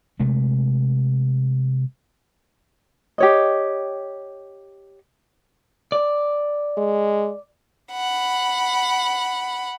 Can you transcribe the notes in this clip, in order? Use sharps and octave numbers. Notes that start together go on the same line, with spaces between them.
C3 G#3 A3
G4 C#5 D#5
D5
G#3
F#5 B5